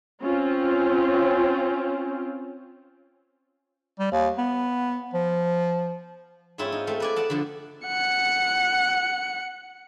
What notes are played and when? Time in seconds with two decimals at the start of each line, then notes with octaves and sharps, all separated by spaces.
0.22 C4 C#4 F4
4.00 G3
4.12 D#2
4.38 B3
5.14 F3
6.58 G#2 C4 C#4 E4 F4 E5
6.72 D#4
6.87 A3 C4
7.00 B4 D5 G#5
7.16 D5 F#5 A5
7.30 D3 F3
7.86 F#5 C#7